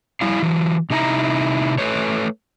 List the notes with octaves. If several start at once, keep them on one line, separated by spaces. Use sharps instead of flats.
G3 E4 F5
E3 F#3
C3 D#4 E4 A5 A#5
A3 B4 C#5